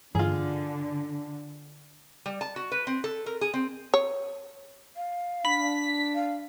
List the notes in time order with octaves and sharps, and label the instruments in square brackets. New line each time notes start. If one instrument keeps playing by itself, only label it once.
[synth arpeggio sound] G2 E3 [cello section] D3 [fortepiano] F4 G#4
[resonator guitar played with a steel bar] G3
A5
F#4
B4
C4
A4
A#4
G#4
C4
[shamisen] C#5
[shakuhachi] F5
[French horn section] D4 [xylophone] B5 [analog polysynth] B6
[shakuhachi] F5